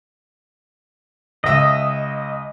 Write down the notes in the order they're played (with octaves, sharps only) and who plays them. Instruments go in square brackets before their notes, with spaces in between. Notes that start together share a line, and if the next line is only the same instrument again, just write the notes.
[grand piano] C#2 E5 [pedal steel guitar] D#5